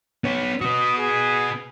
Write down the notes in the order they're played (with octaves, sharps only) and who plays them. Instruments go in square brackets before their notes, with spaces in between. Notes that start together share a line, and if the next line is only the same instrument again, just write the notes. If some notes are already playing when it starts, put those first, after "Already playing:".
[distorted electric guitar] B3 C#5
[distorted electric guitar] B3 F#4 [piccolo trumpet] D#6
[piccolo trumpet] G#4